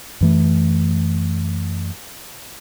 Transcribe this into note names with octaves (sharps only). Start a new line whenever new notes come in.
F#2 E3 A3